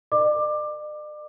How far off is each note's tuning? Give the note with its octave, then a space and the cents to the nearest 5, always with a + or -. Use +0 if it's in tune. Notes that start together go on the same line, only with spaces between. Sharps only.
A#4 +0 D5 +45 D6 +15